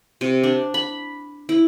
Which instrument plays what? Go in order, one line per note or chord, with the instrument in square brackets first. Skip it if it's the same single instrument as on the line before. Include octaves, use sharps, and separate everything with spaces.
[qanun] C3
D4
B5
E4